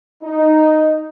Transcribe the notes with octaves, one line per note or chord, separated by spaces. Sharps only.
D#4